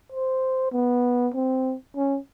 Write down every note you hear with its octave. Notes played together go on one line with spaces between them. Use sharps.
C5
B3
C4
C#4